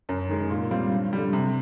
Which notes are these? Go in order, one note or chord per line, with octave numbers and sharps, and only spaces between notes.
F#2
D#3 G#3
A#2
G3 C4 F4
G2
D3 G3
C3